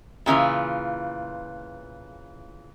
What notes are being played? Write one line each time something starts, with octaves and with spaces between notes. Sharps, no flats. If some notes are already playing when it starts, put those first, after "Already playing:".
A#2 C#3 E3 F4